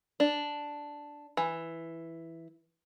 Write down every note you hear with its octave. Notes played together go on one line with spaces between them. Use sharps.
D4
E3